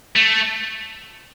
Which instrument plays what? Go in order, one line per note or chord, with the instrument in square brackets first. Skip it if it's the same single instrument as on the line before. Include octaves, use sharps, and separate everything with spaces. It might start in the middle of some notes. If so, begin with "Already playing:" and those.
[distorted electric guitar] A3